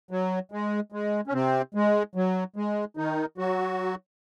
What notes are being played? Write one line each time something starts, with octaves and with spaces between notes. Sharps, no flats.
F#3
G#3
G#3
C#4
C3 C4
G#3
F#3
G#3
D#3 D#4
F#3 F#4